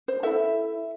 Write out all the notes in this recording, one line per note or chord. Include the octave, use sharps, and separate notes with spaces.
C5
E4 A4 E5